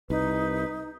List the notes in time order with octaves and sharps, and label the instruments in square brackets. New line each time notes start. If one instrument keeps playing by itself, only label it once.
[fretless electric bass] C2 [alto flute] D#4 [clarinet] B4